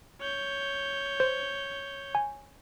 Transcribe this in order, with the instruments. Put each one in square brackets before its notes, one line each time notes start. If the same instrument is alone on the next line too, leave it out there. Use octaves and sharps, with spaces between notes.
[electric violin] C#5 G6
[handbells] C5
G#5